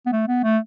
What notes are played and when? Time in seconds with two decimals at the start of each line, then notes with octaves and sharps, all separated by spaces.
0.06 B3
0.13 A3
0.28 B3
0.44 A3